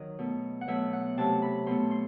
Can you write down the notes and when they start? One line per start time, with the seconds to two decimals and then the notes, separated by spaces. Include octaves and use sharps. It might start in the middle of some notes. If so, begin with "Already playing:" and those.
Already playing: D#3 F#3 D#5
0.19 B2 A3
0.61 F#5
0.68 B2 F#3 A3 E5
0.93 F#5
1.17 C3 F#3 A3 A5
1.42 B5
1.66 B2 A3 C6
1.91 C6